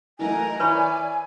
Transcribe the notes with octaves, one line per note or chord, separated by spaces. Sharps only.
E3 F#3 A3 A#4 D#5 F#5 G#5
E4 B4 C#5 D5 B5 C#6 F6